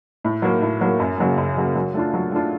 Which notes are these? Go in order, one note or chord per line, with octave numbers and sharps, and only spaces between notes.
A2
F#3 A#3
A2
F#3 A#3
F#2
C#3 F#3 A#3
F#2
C#3 F#3 A#3
F#3
A3 D4 F4
F#3
A3 D4 F4